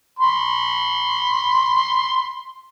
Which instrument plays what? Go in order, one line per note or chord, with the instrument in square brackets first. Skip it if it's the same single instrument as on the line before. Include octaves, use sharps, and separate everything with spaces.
[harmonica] B5 C6